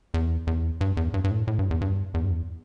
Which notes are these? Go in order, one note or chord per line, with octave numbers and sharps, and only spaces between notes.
E2
E2
G2
E2
G2
G2
A2
A2
G2
E2
G2
E2
G2
E2